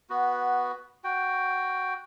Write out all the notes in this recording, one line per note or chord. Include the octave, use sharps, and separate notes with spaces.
B3 F#4
F#4 G5